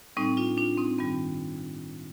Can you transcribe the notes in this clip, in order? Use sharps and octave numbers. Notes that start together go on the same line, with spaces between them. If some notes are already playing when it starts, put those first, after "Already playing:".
A2 G3 C4 D#4
D4 F4
D4 F4
C4 D#4
G2 D#3 G3 C4